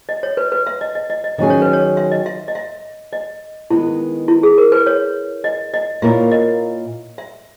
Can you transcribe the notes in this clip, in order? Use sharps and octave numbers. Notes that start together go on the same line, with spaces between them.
D#5
C#5
B4
B4
E5
D#5
D#5
D#5
D#5
D#3 F#3 C#4 G#4 D#5
C#5
B4
C#5
E5
D#5
E5
D#5
E5
D#5
D#3 G#3 B3 E4
E4
G#4
A#4
B4
C#5
D#5
D#5
A#2 A#3 E4 A#4 C#5 E5
D#5
E5